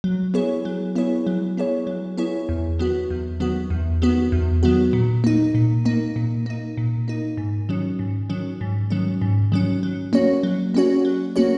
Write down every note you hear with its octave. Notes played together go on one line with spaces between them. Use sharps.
F#3
B3 E4 G#4 C#5
F#3
B3 E4 G#4 C#5
F#3
B3 E4 G#4 C#5
F#3
B3 E4 G#4 C#5
E2
D#3 F#3 B3 F#4
E2
D#3 F#3 B3 F#4
E2
D#3 F#3 B3 F#4
E2
D#3 F#3 B3 F#4
A#2
A#3 D#4
A#2
A#3 D#4
A#2
A#3 D#4
A#2
A#3 D#4
G#2
D#3 F#3 C#4
G#2
D#3 F#3 C#4
G#2
D#3 F#3 C#4
G#2
D#3 F#3 C#4
F#3
A#3 C#4 F#4 C#5
F#3
A#3 C#4 F#4 C#5
F#3
A#3 C#4 F#4 C#5